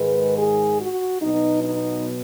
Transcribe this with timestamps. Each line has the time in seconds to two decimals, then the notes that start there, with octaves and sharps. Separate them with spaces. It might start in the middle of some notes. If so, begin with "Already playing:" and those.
Already playing: G#2 D#3 G#3 B4
0.36 G#4
0.78 F#4
1.20 B2 F#3 B3 D#4
1.62 D#4